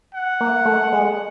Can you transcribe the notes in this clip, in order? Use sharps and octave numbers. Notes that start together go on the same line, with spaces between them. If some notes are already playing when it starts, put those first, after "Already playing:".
F#5
A#3
A3
G#3